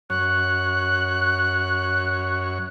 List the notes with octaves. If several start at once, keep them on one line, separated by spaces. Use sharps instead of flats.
F#2 C#5 F#6